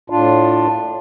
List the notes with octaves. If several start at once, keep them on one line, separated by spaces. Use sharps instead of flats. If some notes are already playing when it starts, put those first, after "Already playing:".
A2 D4 F4